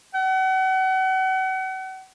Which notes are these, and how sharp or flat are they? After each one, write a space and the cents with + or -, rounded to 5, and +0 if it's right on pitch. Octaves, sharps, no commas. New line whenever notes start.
F#5 +35